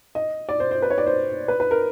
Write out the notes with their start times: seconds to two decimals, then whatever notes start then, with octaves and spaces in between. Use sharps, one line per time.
0.15 D#5
0.49 D5
0.60 C5
0.71 C5
0.82 B4
0.90 C#5
0.98 D5
1.06 C5
1.48 B4
1.60 B4
1.71 A#4